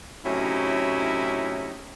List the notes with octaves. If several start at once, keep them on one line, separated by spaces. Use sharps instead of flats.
A2 C3 F#3 C#4 D#4 E4